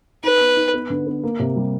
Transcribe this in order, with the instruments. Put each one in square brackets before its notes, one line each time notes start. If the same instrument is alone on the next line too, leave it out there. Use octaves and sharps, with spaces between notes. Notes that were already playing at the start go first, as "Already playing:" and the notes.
[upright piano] D#4 [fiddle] B4
[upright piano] B3
D#4
B3
D3
B3
A#3
C3
G3